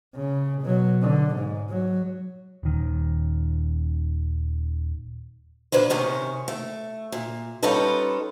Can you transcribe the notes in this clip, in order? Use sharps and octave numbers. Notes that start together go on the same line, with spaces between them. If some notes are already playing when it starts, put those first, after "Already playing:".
C#3
B2 F#3
D3
G#2
F#3
D#1 D#3
A#2 D4 B4 C5
G#2 C3 D#3 C#4
A3
A#2
G3 C#4 D#4 F4 A4 B4